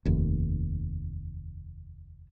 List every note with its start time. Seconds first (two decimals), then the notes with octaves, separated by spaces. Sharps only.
0.05 F1 D#2